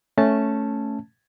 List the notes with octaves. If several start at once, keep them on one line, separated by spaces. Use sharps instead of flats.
A3 C#4 A5